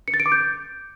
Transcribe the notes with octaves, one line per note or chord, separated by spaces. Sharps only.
C#7
A6
D7
D6
G6